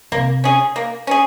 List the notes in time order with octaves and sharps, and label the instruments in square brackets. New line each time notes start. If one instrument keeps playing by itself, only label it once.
[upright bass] C3 [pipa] A#3
[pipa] C#4 G#4
A#3
C#4 G#4